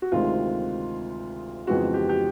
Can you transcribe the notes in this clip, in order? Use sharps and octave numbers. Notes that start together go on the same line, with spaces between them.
F#4
D2 C3 D#3 G#3 C4 F4
F2 C#3 E3 G#3 B3 F#4
G4
G4